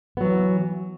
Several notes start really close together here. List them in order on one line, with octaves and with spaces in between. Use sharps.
B3 F#3 E3